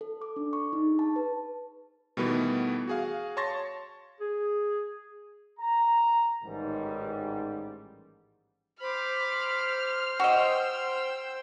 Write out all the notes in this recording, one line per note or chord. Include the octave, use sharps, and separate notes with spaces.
A4
D6
D4
C#6
D#4
G#4
A5
B4
B2 D#3 E3 G3 A3 B3
F#4 G#4 F5
C#5 A5 C6 C#6 A6 A#6
G#4
A#5
A1 G#2 D#3 G3
C5 B5 D6 F6
F#4 D#5 G5 E6